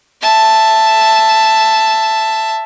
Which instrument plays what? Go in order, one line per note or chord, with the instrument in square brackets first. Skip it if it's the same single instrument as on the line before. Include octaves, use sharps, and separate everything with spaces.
[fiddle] E5 A5